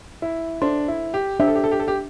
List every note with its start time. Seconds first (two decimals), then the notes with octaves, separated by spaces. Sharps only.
0.22 E4
0.62 D4 A4 C5 E5 C6
0.88 E4
1.14 G4
1.40 D4 G4 C5 E5
1.47 A4
1.55 G4
1.64 A4
1.71 G4
1.80 A4
1.88 G4